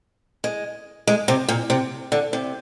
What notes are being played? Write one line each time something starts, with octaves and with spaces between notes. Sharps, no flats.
G#3
G#3
C3
A#2
C3
D3
C3